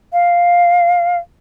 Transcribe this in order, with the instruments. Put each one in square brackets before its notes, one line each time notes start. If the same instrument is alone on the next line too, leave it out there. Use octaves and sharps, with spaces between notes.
[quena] F5